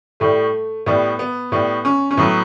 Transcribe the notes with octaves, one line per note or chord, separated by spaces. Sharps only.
A2 G3 A3
A2 G3 B3
B3
A2 G3 B3
C#4
C#4
A2 F#3 B3